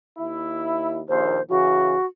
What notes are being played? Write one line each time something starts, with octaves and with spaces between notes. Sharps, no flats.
D#2 E4
A#1 D#2 C5
C#3 E3 F#4